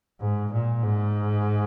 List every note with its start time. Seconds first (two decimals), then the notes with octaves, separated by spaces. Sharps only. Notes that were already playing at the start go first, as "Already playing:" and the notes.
0.20 G#2
0.52 A#2
0.83 G#2